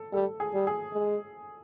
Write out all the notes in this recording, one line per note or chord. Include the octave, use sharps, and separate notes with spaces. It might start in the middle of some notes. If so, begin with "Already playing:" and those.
Already playing: A4
G3 A4
G#4
G3
G#4
G#3